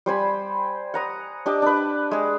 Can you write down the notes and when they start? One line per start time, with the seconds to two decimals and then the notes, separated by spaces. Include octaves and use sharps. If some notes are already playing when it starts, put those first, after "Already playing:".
0.06 G3 C5 G#5 B5
0.94 F#5 A#5 D#6
1.46 D4 G4 D#5 A5
1.62 D4 B4
2.11 G#3 G#4